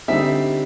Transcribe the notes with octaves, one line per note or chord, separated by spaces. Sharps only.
D3 G3 C4 D#4 E5